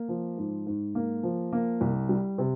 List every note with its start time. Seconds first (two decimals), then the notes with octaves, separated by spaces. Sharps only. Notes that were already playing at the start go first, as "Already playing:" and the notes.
Already playing: A#3
0.08 F3
0.38 G#2
0.67 G#2
0.95 A#3
1.23 F3
1.52 A#3
1.81 C2
2.09 G3
2.38 C3